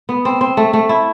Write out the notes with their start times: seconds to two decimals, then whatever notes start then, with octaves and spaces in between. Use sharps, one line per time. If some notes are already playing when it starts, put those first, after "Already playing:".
0.09 B3
0.25 C4
0.41 C4
0.57 A3
0.73 A3
0.89 E4